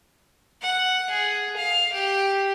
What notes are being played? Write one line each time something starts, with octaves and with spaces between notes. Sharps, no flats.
F#5
G#4
F5
G4